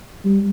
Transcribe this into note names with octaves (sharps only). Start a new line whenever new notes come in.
G3